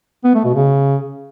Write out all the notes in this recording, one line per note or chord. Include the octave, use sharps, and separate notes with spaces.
B3
A3
B2
C#3